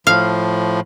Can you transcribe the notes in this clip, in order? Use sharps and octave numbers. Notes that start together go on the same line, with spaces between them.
A2 F3 F5